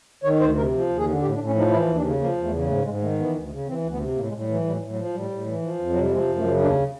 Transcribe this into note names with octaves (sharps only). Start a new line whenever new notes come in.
D#3 C#5
D2 C5
C3 A#4
F3
D#2
G#4
D3
A2 G4
D4
A2
C#4
F3 D#4
E3 E4
D#2
D4
C#3
F3 A#3
E2
A3
C#3
G#2 A3
G#2 G#3
D#3 A3
E3 B3
D2
C#3
E3 C4
D2
B3
C3
A2 A#3
G#3
A2
G3
E3
F#3
A2 G3
A2
F#3
F3
A2 G3
A2
E3
F3
F2
F#3
C3
G3
F3 G#3
F#2
A3
C#3
D#2 D4